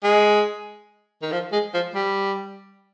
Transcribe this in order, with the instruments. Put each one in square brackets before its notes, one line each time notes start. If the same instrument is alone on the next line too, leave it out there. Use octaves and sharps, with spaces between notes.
[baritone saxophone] G#3
D#3
F3
G#3
F3
G3